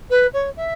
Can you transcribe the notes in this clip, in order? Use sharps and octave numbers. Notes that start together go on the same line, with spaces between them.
B4
C#5
E5